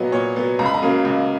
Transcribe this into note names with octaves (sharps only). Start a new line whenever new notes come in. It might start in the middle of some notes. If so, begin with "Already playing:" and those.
Already playing: A#2 F#3 B3 D#5
A#2 C#5
F#3 B3
C#2 A#5
B5
A#5
C#3 F#3 A#3
C#2